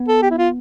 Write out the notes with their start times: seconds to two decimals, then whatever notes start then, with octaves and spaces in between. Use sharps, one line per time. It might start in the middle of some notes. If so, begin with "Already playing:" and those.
Already playing: B3
0.08 A4
0.23 G4
0.31 E4
0.38 F4